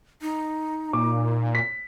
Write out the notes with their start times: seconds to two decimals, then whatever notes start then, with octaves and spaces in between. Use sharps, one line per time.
0.22 D#4
0.93 A#2 D6
1.55 B6